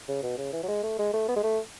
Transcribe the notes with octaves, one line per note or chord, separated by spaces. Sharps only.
C#3
B2
C#3
E3
F#3
G#3
A3
G#3
A3
B3
G#3
A3